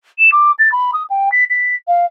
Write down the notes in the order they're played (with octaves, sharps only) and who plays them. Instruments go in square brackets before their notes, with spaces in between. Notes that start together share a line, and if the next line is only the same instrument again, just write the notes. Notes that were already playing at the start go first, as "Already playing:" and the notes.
[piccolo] E7
D6
A6
B5
D#6
G5
B6
B6
F5